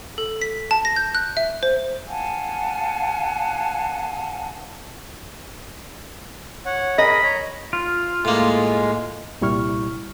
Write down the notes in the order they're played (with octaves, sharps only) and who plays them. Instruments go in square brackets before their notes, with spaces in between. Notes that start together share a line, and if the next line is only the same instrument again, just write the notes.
[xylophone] A4
B6
A5
A#6
G6
F#6
E5
C5
[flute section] F5 F#5 G#5 A5
[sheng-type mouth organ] C#5 F#5
[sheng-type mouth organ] G#4 A#4 [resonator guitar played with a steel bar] D#5 [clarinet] B5
[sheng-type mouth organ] C#5 A#5
[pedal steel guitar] F4
[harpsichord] A2 A#3 [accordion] G#3
[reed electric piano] C2 A#2 G3 E4 C#6 F6